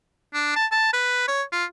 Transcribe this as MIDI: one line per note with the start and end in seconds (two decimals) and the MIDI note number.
0.34 0.53 62
0.56 0.66 81
0.72 0.90 81
0.93 1.28 71
1.28 1.43 73
1.52 1.65 65